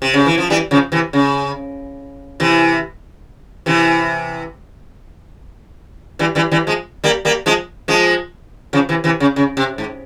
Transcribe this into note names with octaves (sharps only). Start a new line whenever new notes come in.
C3
C#3
E3
F3
E3 G3
C#3 F3
C3 E3
C#3
C3 E3
C3 E3
E3 G3
E3 G3
E3 G3
F3 G#3
G3 A#3
G3 A#3
F3 G#3
F3 G#3
C#3 F3
C3 E3
C3 E3
C#3
C#3
C3
G#2